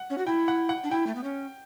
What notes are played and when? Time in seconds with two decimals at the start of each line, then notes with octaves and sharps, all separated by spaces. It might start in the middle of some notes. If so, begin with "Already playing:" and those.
Already playing: F#5
0.10 C#4
0.18 F#4
0.27 E4 G5
0.48 F#5
0.69 F#5
0.84 D4
0.91 E4 G5
1.07 A3
1.15 B3
1.24 C#4